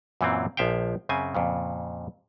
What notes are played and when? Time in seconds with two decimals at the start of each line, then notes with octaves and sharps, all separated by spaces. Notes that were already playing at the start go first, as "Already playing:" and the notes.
0.21 F#2 A#2 E3 F#3 C4
0.57 A#1 F3 E5 F5 G5
1.09 F#2 C#3 C4 G#5
1.35 F2 A#2 C#3